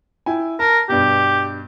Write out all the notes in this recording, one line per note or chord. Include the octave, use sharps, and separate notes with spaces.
E4 G5 G#5
A#4 A5
G2 B2 G4